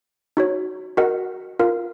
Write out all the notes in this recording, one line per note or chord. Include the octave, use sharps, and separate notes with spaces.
D#4 F#4 C#5
F#4 A#4 D#5 F#5
F4 A#4 F5